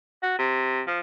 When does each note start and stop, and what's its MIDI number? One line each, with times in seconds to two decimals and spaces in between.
0.22 0.36 66
0.39 0.81 48
0.87 1.00 53